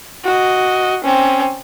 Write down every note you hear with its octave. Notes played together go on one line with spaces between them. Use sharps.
F#4 D#5
C4 C#4